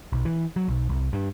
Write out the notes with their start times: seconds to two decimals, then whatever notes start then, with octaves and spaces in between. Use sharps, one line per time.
0.13 B1
0.25 E3
0.56 F#3
0.68 B1
0.89 C2
1.13 G2